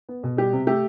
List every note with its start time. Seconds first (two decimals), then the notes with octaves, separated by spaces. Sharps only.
0.09 B3
0.24 B2
0.37 G3 G4
0.53 C3
0.67 A3 G4